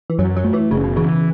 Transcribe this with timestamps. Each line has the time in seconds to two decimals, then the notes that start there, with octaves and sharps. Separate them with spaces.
0.10 E3
0.19 F#2 F#3
0.37 F#3
0.44 A3
0.54 E3
0.71 F#1 C#3
0.84 B2
0.97 C#3 E3